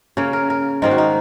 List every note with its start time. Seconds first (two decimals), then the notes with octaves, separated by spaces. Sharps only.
0.17 C#3 A#3 C#5
0.33 A#4
0.50 A#4
0.82 G#2 D#3 A#3 D#4
0.91 F#4
0.98 D#4